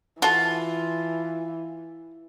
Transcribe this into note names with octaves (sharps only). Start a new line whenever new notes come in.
E3 F4 F#4 A4